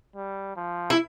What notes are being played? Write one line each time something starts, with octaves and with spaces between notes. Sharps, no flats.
G3
F3
E4